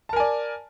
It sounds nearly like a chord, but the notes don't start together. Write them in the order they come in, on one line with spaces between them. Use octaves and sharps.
A5 A#4 G#5 D5